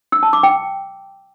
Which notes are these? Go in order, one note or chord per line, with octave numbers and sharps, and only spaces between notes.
E6
A5
D6
G5